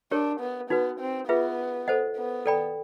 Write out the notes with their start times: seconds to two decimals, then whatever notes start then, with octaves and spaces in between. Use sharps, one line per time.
0.11 D4 G4 A#4 C#5
0.40 B3
0.70 B3 D#4 F#4 B4
1.00 C4
1.28 B3 F4 G#4 B4 E5
1.88 A4 C5 D#5 F#5
2.17 B3
2.46 A4 D5 G5 B5